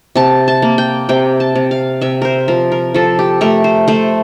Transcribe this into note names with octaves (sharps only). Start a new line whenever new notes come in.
C3 A5
A5
A#3
G5
C3 G5
A5
C3
F5
C3 E5
A#4 C5
F3 A#4
A#4
F3 A4
G4
A3 A#4
C5
A3 C5